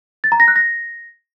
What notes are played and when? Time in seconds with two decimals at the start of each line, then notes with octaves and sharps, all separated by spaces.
0.24 A6
0.32 A#5
0.40 A#6
0.48 F#6
0.56 A#6